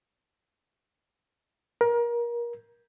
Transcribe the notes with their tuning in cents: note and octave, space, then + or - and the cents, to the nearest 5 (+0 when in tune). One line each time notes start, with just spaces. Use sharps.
A#4 +25